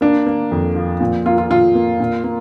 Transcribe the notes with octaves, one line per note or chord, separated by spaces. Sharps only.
A#3 D4
A#3
F2
F3
A#2
A#3 F4
F4
A#2 F4
A#3
A#2
A#3